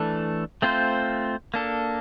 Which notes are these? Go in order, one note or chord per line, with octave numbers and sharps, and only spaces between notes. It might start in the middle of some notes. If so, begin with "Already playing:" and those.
Already playing: E3 A3 D4 A4
A3 C4 F4 C5
A#3 D4 A4